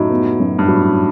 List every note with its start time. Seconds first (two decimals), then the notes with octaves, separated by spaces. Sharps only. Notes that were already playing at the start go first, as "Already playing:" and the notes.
Already playing: F#2 A2 F#3 D#4
0.10 B3
0.40 F#2
0.59 G2
0.68 A2 F#3